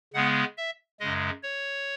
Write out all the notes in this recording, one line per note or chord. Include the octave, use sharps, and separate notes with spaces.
C#3 G#3 B3 F#5
E5
F#2 C#3 G#3 D#5
C#5